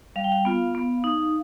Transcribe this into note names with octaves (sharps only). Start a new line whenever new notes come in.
G3 F5
G5
F5
B3 F4
B3
D#4